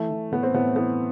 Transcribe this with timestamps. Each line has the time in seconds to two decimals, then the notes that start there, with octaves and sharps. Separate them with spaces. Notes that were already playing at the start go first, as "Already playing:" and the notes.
Already playing: E3 A3
0.10 E3
0.32 A2 B3
0.43 C4
0.54 A2 B3
0.76 E3 B3